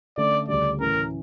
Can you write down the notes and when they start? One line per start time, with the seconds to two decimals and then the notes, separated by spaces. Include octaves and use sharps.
0.17 D3 A3 C#4 D5
0.48 D2 C#3 G3 D5
0.80 A2 E3 A3 C#4 A#4